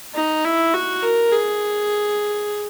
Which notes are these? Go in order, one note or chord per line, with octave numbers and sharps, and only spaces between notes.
D#4
E4
F#4
A#4
G#4